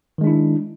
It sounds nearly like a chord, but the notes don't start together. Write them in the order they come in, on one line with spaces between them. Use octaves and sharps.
D#3 G#3 D4 E4